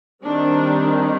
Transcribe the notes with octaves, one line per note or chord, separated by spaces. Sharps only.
D#3 G3 C4 D4